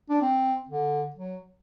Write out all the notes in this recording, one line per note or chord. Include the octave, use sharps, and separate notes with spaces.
D4
C4
D3
F#3